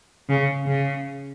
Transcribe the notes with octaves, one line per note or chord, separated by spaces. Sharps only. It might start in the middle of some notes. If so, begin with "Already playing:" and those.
C#3
C#3